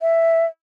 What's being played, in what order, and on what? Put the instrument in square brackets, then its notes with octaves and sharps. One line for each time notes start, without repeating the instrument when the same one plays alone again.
[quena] E5